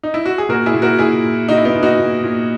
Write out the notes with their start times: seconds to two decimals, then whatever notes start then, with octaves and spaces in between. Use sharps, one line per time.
0.03 D#4
0.14 E4
0.26 F#4
0.38 G#4
0.49 A#2 F#4 A#4
0.66 E4 G#4
0.74 A#2
0.82 F#4 A#4
0.99 A#2 E4 G#4
1.24 A#2
1.48 A#2 D#4 F#4
1.58 E4
1.65 B3 D#4
1.74 A#2
1.83 D#4 F#4
1.99 A#2
2.24 A#2